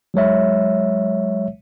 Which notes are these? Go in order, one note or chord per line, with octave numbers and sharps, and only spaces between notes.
F#3 G#3 C#5 E5